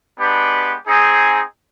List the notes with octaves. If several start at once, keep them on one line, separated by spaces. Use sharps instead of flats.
G#3 B3 D4 G4 B4
C4 D#4 G#4